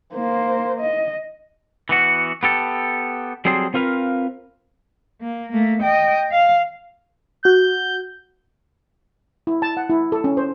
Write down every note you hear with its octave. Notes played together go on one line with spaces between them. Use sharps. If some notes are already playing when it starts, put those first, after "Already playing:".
A#3 C5
D#5
E3 B3 F#4
B3 G4 A4
F#3 G3 C4 G#4 A4 C6
C4 F4 A#4 B4 F5
A#3
A3 A#3
D#5 G5
F5
F#4 G6
E4
A5
F#5
E4
A4
C#4
C5